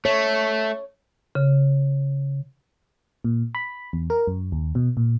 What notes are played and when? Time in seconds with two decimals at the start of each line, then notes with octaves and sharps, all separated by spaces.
0.05 A3 C#5
1.35 C#3
3.24 A#2
3.55 B5
3.93 E2
4.10 A#4
4.27 F#2
4.52 D#2
4.75 B2
4.97 A#2